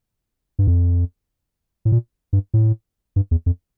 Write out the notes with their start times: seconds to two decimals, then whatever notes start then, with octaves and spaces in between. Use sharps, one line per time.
0.59 G2
0.67 F2
1.85 A2
1.92 A#2
2.33 G2
2.54 A2
3.16 G2
3.31 E2
3.46 F2